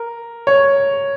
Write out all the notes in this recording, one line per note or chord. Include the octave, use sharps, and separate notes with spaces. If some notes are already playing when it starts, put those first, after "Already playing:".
Already playing: A#4
C#5